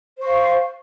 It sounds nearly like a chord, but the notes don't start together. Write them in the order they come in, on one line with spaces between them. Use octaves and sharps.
C5 C#6 F5